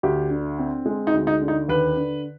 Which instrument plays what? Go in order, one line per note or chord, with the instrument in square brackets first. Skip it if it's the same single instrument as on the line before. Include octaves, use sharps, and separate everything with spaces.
[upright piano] D2 G4
D3
C4
G#3
D#4
D2
D#4
D3
D#4
D#2 B4
D3